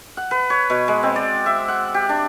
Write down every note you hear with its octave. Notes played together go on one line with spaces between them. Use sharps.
F#5
B4
C#5
B2
G#3
C4
D5
E5
F#5
G4
D4